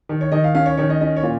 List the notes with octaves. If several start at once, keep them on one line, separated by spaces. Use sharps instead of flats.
D#3
C#5
D#3 D#5
F5
C#4 F5
C#5
D#3 C#5
D#5
C#4 D#5
C#5
A#2